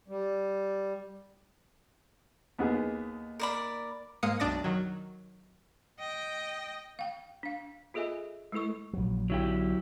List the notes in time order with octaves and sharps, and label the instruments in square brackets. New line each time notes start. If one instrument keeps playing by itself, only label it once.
[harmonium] G3
[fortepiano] D#2 B3 G#4
[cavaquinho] A#4 D5 B5
[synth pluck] G#2 G#3 A#3 F5 D#6 C#7
B1 F#2 D4 D5 D#6 A#6
D#3 F#3
[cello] D#5 G5
[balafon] F5 G5
D4 F5
F4 G#4 A4 D#5 E5 G#5
G#3 A3 E4 A4 C#6
[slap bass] A#1 F#3
[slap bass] B1 D3 [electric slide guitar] F#3 E4 G4